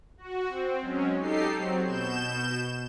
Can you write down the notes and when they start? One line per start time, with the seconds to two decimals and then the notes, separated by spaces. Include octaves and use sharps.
0.18 F#4
0.49 C4
0.82 F#3 G#3 C#4
1.18 D#4 G4 A4 C7
1.56 F#3 C4
1.86 B2 G6 E7